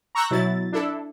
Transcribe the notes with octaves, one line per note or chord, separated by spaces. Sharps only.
A#5 C#6 E6 F#6 G6 A#6
B2 F#3 E4 A6
D4 E4 A4